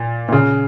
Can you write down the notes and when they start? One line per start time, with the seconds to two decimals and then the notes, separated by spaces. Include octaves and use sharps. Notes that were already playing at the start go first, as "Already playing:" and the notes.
Already playing: A#2
0.29 A#2
0.32 C#3